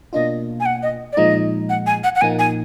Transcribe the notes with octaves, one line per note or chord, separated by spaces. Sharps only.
B2 A#3 D4 F4 D#5
G#5
F#5
D#5
D5
A#2 F3 G#3 D#4 D#5
F#5
G#5
F#5
F#5
A#2 F3 A#3 D#4 G#5
G#5